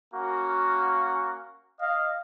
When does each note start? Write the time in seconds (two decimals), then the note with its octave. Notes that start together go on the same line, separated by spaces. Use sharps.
0.12 A#3 C#4 F#4
1.80 D#5 F5